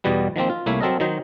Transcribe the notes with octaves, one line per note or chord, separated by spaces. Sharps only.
E2 B2 G3 B3
D#3 F3 A#3 C4
F4
C2 A3 A#3 E4 C#5 E5
F#3 C4 A4 A#4 D#5
D#3 F#3 D#4 C5